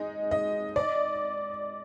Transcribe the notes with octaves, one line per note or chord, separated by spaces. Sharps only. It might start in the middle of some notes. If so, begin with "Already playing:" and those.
Already playing: G#3 D#4
D#5
D5